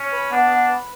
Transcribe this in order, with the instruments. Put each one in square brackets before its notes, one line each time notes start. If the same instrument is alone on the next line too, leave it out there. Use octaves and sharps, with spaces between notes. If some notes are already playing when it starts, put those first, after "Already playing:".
Already playing: [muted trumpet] C#4
[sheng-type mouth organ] B4
[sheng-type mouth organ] B3 [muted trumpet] D4
[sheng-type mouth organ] B3
B4